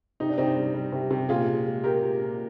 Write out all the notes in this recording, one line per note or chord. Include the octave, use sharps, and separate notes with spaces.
C3 D#4
D4
C3 C4 D#4
G3
G3
C3
C3
A#2 F4 G#4
A#2
G#3
G#3 G4 A#4
A#2
A#2